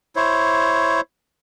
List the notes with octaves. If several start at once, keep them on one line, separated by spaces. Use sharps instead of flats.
E4 C5 C#5